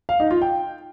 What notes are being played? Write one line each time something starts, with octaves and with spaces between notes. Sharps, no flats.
F5
D#4
F4
G5